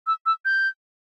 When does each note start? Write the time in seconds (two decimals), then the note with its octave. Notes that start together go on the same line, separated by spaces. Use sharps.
0.07 E6
0.26 E6
0.45 G6